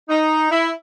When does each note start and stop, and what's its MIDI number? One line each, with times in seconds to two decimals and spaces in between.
0.09 0.47 63
0.51 0.70 64